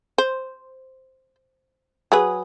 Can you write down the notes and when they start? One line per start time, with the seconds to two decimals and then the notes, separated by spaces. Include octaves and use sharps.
0.18 C5
2.12 F#3 G#4 B4